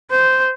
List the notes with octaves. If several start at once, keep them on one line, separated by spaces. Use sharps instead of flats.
C5